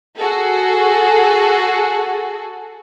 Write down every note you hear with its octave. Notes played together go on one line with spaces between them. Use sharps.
F#4 G#4 A4